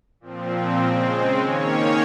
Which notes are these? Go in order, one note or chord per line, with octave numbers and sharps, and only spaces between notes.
A#2 F3 C4
C#3 G#3 C4
D#3 A#3 C#4 C#5